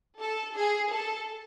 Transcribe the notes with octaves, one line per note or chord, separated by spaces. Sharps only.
A4
G#4
A4